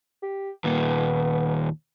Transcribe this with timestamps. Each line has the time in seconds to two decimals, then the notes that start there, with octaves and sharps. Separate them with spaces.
0.23 G4
0.64 D#2 A#2 B3